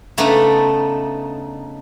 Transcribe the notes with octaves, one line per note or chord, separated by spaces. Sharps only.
C#3 A3 B3 D4 D#4